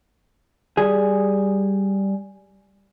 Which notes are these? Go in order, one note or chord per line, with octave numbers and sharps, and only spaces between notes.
G3 G#4